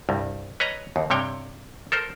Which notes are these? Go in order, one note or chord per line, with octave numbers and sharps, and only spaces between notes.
C2 G2
B4 C#5 D#5 A#5
D#2
G2 C3 C#5 G5
A4 A#4 C5